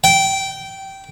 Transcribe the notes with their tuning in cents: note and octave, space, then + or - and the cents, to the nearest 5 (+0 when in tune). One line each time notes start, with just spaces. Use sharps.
G5 -15